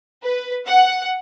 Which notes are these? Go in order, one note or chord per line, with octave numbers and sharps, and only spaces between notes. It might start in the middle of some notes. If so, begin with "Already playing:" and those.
B4
F#5